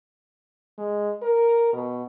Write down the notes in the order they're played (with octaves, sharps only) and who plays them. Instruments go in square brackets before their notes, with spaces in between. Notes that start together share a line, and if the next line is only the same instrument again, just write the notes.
[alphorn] G#3
A#4
B2